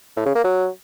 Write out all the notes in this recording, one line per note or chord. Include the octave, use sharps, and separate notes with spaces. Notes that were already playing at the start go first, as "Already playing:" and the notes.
A2
C#3
A#3
F#3